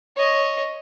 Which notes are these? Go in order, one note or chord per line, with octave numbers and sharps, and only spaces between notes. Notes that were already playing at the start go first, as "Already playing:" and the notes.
C#5 D#5